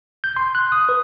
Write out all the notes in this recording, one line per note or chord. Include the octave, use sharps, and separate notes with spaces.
G6
C6
F#6
D#6
B4